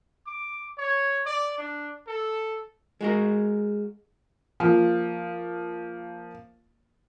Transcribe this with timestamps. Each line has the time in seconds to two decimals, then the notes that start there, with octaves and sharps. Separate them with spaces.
0.27 D6
0.78 C#5
1.26 D5
1.58 D4
2.07 A4
3.01 G#3 F#4 A#4
4.60 F3 A#3